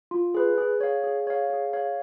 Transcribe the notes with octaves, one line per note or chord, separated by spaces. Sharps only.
F4
G#4 B4
G#4
C#5 F5
G#4
C#5 F5
G#4
C#5 F5